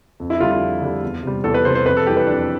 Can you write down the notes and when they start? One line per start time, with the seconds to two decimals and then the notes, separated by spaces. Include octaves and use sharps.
0.20 F2
0.30 E4
0.40 D3 G3 F4
0.51 F4
0.61 F2
0.81 D3 G3
1.03 E2
1.23 C3 G3
1.44 E2 A4
1.54 B4
1.65 C3 G3 C5
1.75 C5
1.86 F2 B4
1.97 A4
2.06 E3 G3 G4
2.17 B4
2.27 F2 D4